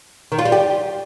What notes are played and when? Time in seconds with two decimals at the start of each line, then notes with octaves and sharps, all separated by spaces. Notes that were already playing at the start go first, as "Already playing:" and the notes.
0.32 D#3
0.39 F4
0.45 G3
0.52 G4